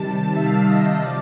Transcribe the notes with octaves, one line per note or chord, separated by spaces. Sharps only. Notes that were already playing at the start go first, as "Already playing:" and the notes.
Already playing: C3 D#3 G3 A5
C3 D#3 G3 E5
F5
E5
D#5
C3 F3 D5